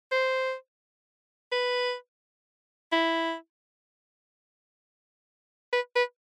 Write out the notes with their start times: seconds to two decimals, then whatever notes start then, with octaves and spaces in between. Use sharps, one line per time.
0.12 C5
1.52 B4
2.92 E4
5.73 B4
5.96 B4